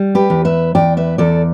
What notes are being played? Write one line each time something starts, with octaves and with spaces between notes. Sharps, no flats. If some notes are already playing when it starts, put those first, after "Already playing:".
Already playing: G3
G4 B4
E2
B4 E5
E2 D5 G5
B4 E5
E2 A4 D5